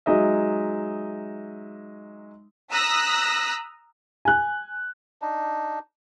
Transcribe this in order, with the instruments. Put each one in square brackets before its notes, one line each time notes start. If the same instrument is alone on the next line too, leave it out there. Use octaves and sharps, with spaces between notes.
[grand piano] F#3 G#3 D#4 D#5 E5
[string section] A#5 D#6 E6 F#6 A#6 B6
[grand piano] G#5 F#6
[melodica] D4 D#4